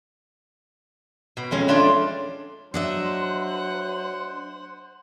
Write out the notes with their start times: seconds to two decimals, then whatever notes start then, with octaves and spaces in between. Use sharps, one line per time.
1.37 B2
1.51 F2 G#3 C#4
1.68 A3 D4 F4 D5
2.74 F#3 D4 C5 D#5 E5 F#5